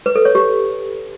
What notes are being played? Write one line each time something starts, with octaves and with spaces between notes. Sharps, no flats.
B4
A4
C#5
G4